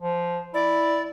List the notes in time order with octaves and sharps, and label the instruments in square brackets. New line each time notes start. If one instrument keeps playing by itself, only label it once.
[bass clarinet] F3
[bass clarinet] E4 [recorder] D5